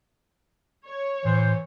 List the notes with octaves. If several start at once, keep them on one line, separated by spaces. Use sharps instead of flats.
C#5
A2 E3 C5